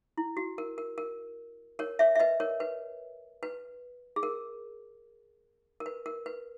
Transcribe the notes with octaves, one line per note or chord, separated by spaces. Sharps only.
E4
F#4
A#4
A#4
A#4
A#4 C#5
C#5 E5
E5
B4 D#5
A#4 C#5
B4
B4
G#4
A#4
A#4
B4
A#4
B4